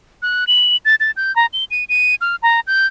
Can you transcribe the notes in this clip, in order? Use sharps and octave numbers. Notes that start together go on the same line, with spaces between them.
F#6
F#7
A6
A6
G6
A#5
G7
D#7
D#7
F6
A#5
G6